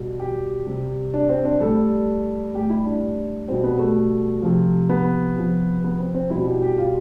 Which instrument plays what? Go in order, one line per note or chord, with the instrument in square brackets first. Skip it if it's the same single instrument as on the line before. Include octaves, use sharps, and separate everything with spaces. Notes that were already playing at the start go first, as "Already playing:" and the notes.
Already playing: [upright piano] B2 G3
G4
C3 G3
D4
C4
D4
A2 G3 A4
A2 G3 G4
E4
D4
B2 G3 C4
B3
A3
C3 F3
B3
C3 F3
B3
C4
C4
G3 E4
B2
G4
G4
F4